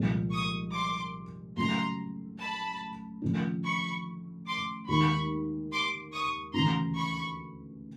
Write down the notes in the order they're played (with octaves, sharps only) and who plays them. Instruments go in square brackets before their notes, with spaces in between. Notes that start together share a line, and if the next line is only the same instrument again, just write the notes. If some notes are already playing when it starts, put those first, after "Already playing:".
Already playing: [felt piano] C2 A#2 F3 G#3
[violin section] C#6 D#6
C6 D6
[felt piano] C#3 F#3 A3 [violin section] A#5 C6
[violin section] A5 B5
[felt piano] C#3 F3 A3 D4
[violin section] B5 C#6
C6 D6
[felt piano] D#2 D#3 G#3 [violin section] B5 C#6
[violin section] C6 D6
C#6 D#6
[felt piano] D2 C#3 E3 [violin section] A#5 C6
[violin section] B5 C#6